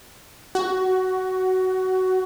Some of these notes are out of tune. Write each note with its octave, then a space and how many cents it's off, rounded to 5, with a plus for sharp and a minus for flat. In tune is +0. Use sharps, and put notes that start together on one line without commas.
F#4 +15